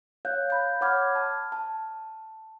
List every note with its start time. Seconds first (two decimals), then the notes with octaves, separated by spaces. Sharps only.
0.25 C#5 F5 F#6 G6
0.50 B5 G6
0.81 C#5 F#5 B5 D6 F6 G#6
1.15 A5 F6
1.52 A5